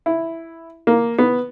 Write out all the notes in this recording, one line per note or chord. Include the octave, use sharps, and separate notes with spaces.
E4
A#3
B3